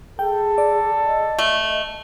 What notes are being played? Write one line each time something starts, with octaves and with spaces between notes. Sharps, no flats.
G#4 A4 G5
D5
D#5
A3